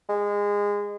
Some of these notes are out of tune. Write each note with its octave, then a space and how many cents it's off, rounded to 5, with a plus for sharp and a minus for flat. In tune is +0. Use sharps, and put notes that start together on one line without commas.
G#3 -20